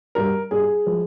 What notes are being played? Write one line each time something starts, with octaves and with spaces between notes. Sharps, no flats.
G2 G3 A#4
G2 G3 G#4
F3 G#3